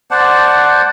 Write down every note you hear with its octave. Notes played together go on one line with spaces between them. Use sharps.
C5 D5 F#5 A5